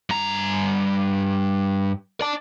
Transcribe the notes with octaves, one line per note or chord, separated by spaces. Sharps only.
G2 A#5
D5 A5